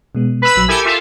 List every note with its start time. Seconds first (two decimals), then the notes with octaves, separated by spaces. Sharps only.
0.15 B2 G#3 B3
0.42 B4 B5 E6
0.56 A#1 F#3
0.69 E4 G4 A4 A#4 G#5
0.85 F4 A4 E5